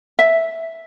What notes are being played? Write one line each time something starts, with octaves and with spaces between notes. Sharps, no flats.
E5